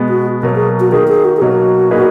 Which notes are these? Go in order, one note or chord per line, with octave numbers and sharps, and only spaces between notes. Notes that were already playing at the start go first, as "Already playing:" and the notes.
Already playing: B2 G#3 B3
F#4
B2 F#3 A#3 A#4
G#4
F#4
D#3 A#3 D#4 G#4
G#4
F#4
G#4
B2 F#3 A#3 D#4 F#4
A#2 A#3 D#4 G#4 B4